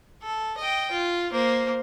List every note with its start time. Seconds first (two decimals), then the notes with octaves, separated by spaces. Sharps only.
0.23 A4
0.58 D#5 G5
0.91 F4
1.32 A#3 C5